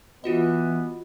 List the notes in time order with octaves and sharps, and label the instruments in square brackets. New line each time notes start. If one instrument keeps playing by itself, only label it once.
[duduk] E3 [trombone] B3 [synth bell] F4 F#4 D#5